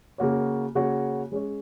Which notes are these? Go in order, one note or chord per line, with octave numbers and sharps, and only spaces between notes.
C#3 A#3 F#4 C#5
C#3 A#3 F#4 C#5
G#3 C#4 G#4 C#5